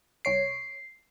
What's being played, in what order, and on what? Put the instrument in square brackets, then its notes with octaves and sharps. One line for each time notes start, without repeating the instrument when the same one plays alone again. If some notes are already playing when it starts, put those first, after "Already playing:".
[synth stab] C2 C#5 D7 [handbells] C7